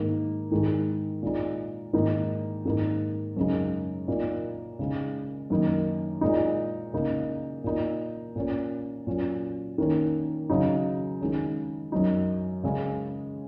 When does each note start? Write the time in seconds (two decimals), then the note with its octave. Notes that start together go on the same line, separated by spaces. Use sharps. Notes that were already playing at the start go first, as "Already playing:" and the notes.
Already playing: G#2 D#3 A#3 D#4
0.51 G#2 D#3 G#3
1.23 A#2 G#3 D#4
1.93 G#2 D#3 A#3 D#4
2.65 G#2 D#3 A#3 D#4
3.36 F#2 C#3 G#3 D#4
4.08 A#2 A#3 D#4
4.79 C#3 G#3 D#4
5.50 F#2 D#3 A#3 D#4
6.21 A#2 G#3 D#4
6.93 C#3 A#3 D#4
7.64 A#2 A#3 D#4
8.36 A#2 A#3 C#4
9.07 A#2 F#3 C#4
9.78 D#3 A#3 C#4
10.50 C#3 F#3 D#4
11.21 D#3 G#3 C#4
11.92 F#2 F#3 D#4
12.63 C#3 G#3 C#4